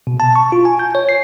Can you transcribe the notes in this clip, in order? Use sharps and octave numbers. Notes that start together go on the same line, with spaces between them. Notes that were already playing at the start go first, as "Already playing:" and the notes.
B2
A5
C#6
F4
G#5
G6
C#5
C7